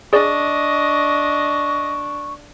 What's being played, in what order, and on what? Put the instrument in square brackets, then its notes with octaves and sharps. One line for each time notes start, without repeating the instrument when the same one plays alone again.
[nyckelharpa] D4 [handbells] G#4 D5 [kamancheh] D#5 [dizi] C#6